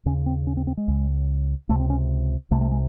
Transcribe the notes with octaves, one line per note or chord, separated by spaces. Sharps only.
D#2 C#3 C#4
C4
C#4
C4
C4
G#3
C#2 C#3
C#2 C3 A3
C4
C#4
C2 C3 A3
A3
G#3